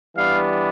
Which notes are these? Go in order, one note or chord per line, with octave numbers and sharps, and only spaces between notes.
E3 G3 B3 D4 F5